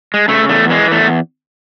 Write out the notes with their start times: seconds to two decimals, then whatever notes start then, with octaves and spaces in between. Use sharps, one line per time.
0.14 G#3
0.28 C#3 A3
0.49 E2 A3
0.70 E3 G#3
0.91 E2 A3